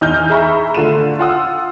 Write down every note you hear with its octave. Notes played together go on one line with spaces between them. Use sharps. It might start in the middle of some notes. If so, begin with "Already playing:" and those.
E2 D#4 F6 G6
G#4 E5 A#5 B5 C#6
D3 A3 F4 D#7 E7
F4 F#5 D#6 E6